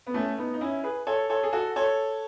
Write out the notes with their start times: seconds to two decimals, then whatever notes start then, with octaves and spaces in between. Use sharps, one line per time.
0.07 B3
0.14 A3 C#4
0.38 B3 D#4
0.54 D#4
0.61 C#4 E4
0.83 G#4 B4
1.07 A4 C#5
1.30 A4 C#5
1.43 G#4
1.53 F#4 A4
1.76 A4 C#5